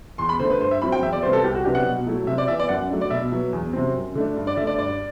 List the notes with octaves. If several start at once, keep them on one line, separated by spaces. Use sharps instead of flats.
E2 C6
B5
D3 A3 C5
B4
G2 C5
E5
F#3 C4 E4 B5
G5
E2 E5
D5
C3 G3 B3 C5
A4
C2 G4
F#4
C3 F#3 B3 D4 G4
F#5
B2
F#3 A3 E4
C3 E5
D5
E3 B3 E5
D5
F#2 F#5
F#3 A3 D4
D5
B2 E5
F#3 B3
E2
C3 F#3 C4
F#2
D3 A3 D4
G2
D5
D3 A3 E5
D5
G2 D5